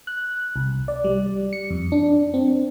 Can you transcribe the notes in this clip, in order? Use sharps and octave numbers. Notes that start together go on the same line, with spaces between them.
F#6
C2
D5
G3
C#7
F2
D4
C4